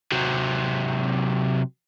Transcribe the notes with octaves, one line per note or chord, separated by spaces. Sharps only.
C3 F#3